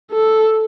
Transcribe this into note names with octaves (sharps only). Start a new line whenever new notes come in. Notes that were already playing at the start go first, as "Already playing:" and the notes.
A4